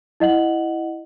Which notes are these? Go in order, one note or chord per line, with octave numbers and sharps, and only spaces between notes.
E4 D#5 F#5 F#7